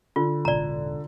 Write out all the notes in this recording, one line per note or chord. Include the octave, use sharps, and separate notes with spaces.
D3 F4
E1 A1 D5 A#5